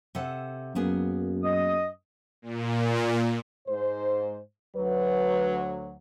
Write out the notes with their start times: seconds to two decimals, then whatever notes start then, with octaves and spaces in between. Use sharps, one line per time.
0.15 C3 A4 F#5
0.75 F#2 A#3 B3 G#4
1.43 D#5 D#6
2.42 A#2
3.68 G#2 C5
4.76 D2 F#3 B4